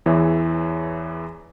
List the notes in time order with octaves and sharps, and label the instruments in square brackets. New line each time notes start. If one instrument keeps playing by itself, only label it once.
[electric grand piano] E2 E3 G#4 C#5 E5